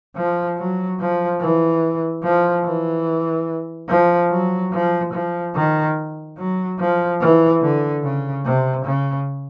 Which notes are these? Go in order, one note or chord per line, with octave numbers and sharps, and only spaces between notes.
F3
F#3
F3
E3
F3
E3
F3
F#3
F3
F3
D#3
F#3
F3
E3
D3
C#3
C3
C#3